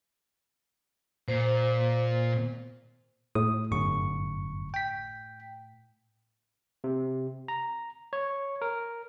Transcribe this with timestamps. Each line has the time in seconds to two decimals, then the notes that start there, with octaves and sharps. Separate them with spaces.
1.28 A#2 C5
3.35 A2 D#6
3.71 G1 F#2 C#6
4.74 G5 B6
6.84 C3
7.48 A#5
8.13 C#5
8.62 A#4